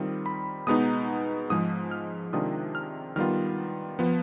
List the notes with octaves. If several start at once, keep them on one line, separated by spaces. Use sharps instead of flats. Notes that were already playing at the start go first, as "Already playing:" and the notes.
Already playing: D#3 G3 C4 F4 D#6
B5
B2 G#3 B3 D#4 D#6
G#2 F3 G#3 D#6
F6
C3 D#3 G#3 D4 F4 D#6
F6
D#3 G3 B3 F4 F6
F3 B3